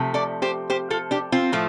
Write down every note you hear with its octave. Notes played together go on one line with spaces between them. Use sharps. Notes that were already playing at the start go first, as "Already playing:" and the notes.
Already playing: C3 F3 A3
A4 D5
G4 C5
G4 C5
F4 A4
D4 G4
C4 F4
A2 F3 A3